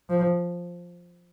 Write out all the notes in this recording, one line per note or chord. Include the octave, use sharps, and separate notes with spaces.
F3